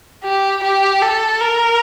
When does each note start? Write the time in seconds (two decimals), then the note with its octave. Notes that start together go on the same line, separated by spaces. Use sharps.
0.24 G4
0.63 G4
1.02 A4
1.41 A#4